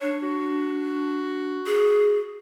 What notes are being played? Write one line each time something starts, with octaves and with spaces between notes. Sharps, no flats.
D4 C#5
F#4
G#4